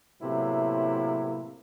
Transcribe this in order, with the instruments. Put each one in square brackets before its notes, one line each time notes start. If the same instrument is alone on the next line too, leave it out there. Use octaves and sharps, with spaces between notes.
[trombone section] A2 C3 F#3 A#3 B3 E4